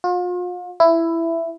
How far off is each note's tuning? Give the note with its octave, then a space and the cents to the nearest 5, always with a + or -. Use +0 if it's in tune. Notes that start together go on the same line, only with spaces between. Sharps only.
F4 +40
E4 +10